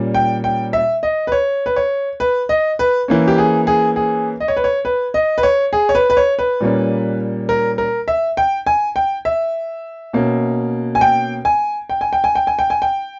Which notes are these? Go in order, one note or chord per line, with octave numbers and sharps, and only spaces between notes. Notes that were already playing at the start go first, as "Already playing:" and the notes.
Already playing: A#2 G3 C#4
G5
G5
E5
D#5
B4
C#5
B4
C#5
B4
D#5
B4
E3 A#3 C#4
G4
G#4
G#4
G#4
D#5
C#5
B4
C#5
B4
D#5
B4
C#5
G#4
C#5
B4
B4
C#5
B4
A#2 G3 A#3 C#4
A#4
A#4
E5
G5
G#5
G5
E5
B2 A#3 C#4
G#5
G5
G#5
G5
G#5
G5
G#5
G5
G#5
G5
G#5
G5